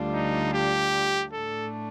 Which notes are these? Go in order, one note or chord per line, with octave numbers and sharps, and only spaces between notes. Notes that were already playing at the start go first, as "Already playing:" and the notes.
Already playing: D2 D3 G3 D4 F4
D#4
G4
A2 A3 D4 A4